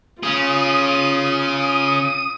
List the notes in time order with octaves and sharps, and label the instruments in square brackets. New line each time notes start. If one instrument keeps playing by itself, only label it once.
[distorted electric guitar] C#4 G#4 [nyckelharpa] F4 [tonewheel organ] D#6